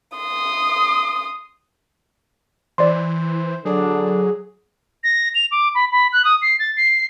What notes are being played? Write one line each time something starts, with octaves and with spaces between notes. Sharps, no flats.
C6 D#6
E3 C5 D5 C6
D3 F#3 D4 G#4
A#6
F7
D6
B5
B5
F#6
D#6
C7
A6
C7